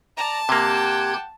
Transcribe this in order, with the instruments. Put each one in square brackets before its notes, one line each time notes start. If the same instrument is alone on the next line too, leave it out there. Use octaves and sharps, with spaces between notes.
[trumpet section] D5 A#5 [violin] A5
[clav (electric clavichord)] C3 A#3 [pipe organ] G4 F#6 G#6 [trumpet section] F#5 G5